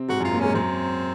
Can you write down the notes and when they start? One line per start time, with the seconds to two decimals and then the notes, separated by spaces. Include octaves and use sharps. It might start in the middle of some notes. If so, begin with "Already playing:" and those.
Already playing: C3 C4
0.09 G#2 G#3 F#4
0.20 F#2 F#3
0.25 F4
0.32 A#2 A#3
0.40 G#2 G#3 C#4
0.54 F#2 F#3 C4